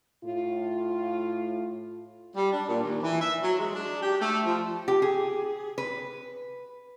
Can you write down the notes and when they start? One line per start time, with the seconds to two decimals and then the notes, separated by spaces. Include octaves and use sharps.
0.25 A2 F4
2.36 G3
2.52 D4
2.69 A#2
2.83 D#2
3.03 E3
3.21 E5
3.42 F#3
3.59 G#3
3.74 D4
4.02 G4
4.21 A3
4.46 F3
4.88 G4
5.02 G#4
5.78 B4